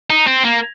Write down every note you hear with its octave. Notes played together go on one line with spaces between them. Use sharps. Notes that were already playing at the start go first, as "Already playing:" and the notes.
D#4
C4
A#3